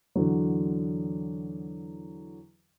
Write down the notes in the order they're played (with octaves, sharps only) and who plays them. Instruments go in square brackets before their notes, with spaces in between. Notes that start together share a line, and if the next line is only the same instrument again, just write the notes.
[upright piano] E2 D3 F#3